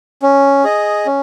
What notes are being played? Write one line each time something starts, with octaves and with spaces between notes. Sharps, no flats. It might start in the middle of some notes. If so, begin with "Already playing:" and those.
C#4
G#4 D#5
C#4